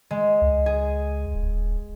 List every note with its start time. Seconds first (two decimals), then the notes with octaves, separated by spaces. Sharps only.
0.11 G#3
0.42 C#2
0.66 G#4
1.35 D#1